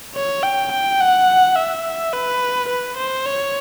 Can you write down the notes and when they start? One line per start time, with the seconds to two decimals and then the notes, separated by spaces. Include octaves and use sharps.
0.15 C#5
0.43 G5
0.72 G5
1.00 F#5
1.56 E5
2.13 B4
2.69 B4
2.97 C5
3.26 C#5